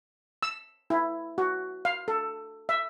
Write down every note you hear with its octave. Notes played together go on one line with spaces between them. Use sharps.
E6
E4
F#4
F5
A4
E5